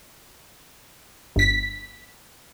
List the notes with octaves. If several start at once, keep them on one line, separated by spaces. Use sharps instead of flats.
G1 B6